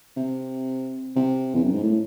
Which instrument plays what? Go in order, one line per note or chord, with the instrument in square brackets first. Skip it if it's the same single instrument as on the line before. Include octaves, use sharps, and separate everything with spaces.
[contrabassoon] C3
C3
E2
F#2
G#2
A2